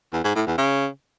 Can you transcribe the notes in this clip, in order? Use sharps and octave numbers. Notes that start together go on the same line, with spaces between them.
E2
G#2
A2
E2
C#3